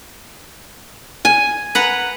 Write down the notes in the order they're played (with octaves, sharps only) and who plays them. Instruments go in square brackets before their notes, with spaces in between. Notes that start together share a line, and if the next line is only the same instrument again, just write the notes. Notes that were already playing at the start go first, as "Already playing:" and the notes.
[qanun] G#5
[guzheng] B4 F#5 A#5